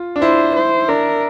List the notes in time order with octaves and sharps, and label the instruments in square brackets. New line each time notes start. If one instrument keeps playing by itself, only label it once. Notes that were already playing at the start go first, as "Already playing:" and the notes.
Already playing: [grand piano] F4
D4
[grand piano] E4 [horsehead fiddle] C5
[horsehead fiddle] C5
[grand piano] D4 [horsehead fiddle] A#4